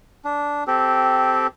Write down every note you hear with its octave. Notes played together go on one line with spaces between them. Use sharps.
D4
C4 G4 A4